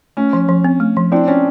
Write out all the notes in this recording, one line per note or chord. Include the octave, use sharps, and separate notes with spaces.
A3 C#4
F3
F3
C4
A3
F3
C4 D4 E4
C#4 C#5